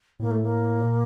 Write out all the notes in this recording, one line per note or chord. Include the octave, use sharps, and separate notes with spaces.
A2 A#3
A3
A#3
A#2